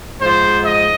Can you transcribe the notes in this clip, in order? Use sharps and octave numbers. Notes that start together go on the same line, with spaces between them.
G#2 F3 C5
D#5